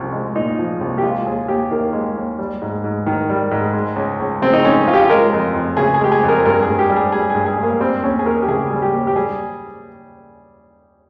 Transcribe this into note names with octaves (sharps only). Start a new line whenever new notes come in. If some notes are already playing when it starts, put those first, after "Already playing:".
Already playing: C2 F3 C#4
G#3
A#2 D#4
F3
C2
G4
G#3 F4
D#2 G#4
D#2 G4
D#3 A#3
G#3
D#2
G3
G#2
G#2
D#3
G3
G#2
G#3
C#2
C#2
C#3 C4
D#4
G#3 C#4
C#2 F4
G4
F4
G#3 A#4
F2
F2
C#3 G#4
G#4
G#3 G4
G#4
F2
A#4
G2 A#4
G#4
G2
G4
G3
G#4
G3 G#4
G2 G#4
G#4
G2
A#3
G3 C4
D#2 C#4
G#4
D#2 A#4
G4
C#3 G#4
G3 G#4
G4
D#2
G4
G3 G#4